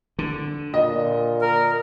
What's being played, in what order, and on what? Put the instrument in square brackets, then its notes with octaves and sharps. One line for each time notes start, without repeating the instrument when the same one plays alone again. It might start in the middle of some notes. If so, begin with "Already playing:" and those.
[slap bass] D3
[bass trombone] A#2 [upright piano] D#5
[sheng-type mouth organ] A#4